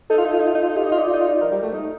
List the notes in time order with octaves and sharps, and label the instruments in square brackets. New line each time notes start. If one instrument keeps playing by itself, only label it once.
[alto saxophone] D#4 [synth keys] A4
[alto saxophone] F4
D#4
F4
D#4
F4
D#4
F4
D#4
[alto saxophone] F4 [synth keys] G4
[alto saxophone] D#4
[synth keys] D#5
[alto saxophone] F4
[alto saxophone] D#4 [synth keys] D5
[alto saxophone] F4
D#4
[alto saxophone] F4 [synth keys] D5
[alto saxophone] D#4
[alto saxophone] F3 [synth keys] A#4
[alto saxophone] G3
A3
D#4